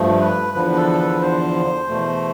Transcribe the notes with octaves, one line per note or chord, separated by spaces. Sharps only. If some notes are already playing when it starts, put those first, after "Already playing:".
Already playing: G2 F3 A3
B4
E2 D3 F3 B4
B4
A4
B4
C5
E2 B2 A3